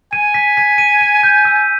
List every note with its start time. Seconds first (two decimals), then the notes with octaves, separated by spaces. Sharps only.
0.13 G#5 D#7
0.34 B6
0.57 B6
0.78 D#7
1.01 D#7
1.23 G6
1.45 E6